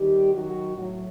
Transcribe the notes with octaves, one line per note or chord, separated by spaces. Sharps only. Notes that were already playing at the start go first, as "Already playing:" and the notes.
Already playing: D#2 D#3 G3 G4
F#2 D#3 F#3 F#4
A2 F#3